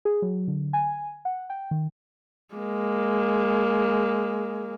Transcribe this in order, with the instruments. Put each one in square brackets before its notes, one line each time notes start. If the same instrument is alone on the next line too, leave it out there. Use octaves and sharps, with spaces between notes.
[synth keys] G#4
F#3
D3
G#5
F#5
G5
D#3
[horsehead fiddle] G#3 A#3